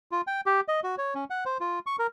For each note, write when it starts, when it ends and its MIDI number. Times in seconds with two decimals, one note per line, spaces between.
0.11 0.21 65
0.27 0.41 79
0.46 0.61 67
0.68 0.80 75
0.84 0.95 66
0.98 1.14 73
1.15 1.24 61
1.30 1.44 78
1.46 1.58 72
1.61 1.79 65
1.87 1.96 85
1.99 2.07 70